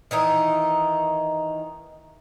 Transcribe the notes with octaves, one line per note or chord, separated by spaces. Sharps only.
D#3 E3 D#4